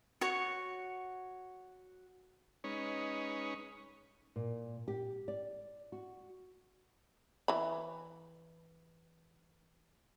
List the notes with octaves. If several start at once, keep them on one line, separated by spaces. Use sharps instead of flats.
F#4 C#5
G#3 C#4 D#4 B4 C#5
A#2
G4
D5
F#4
E3 B5